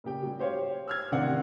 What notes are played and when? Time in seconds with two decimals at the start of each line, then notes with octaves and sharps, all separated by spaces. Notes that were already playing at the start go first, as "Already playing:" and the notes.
0.04 A#2 C#3 G4 G5
0.23 F#3 G3
0.39 G4 C5 C#5 F5
0.88 E6 F6 G#6
1.12 A1 C3 D#3 D4 F5 F#5